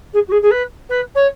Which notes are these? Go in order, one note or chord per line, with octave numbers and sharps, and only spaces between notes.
G#4
F#4
G#4
G#4
B4
B4
C#5